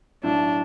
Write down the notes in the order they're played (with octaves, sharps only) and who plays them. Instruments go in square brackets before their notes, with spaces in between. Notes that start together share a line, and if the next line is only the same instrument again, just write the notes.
[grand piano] B1 A2 F#3 [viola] D4